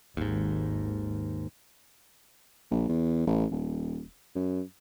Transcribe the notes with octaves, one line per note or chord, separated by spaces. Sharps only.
G#1 D#2 G#2
A#1
E2
A1
D#1
F#2